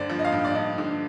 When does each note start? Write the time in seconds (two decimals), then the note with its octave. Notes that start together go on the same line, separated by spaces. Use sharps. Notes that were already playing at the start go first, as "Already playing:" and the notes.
Already playing: G2 D3 C5 D5
0.10 F3
0.19 D#5
0.25 F5
0.32 G2
0.44 D5
0.55 G2 D#5
0.78 D3